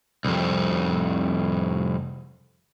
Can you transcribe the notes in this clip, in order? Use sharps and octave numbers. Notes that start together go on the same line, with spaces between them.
C2 F2